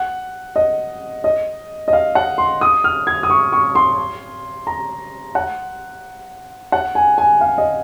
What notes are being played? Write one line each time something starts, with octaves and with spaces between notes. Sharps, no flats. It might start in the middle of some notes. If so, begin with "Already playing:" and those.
Already playing: F#5
D#5
D#5
D#5
F5
F#5
C6
D#6
F6
G#6
D#6
C#6
C#6
C6
A#5
F#5
F#5
G#5
G#5
F5
D#5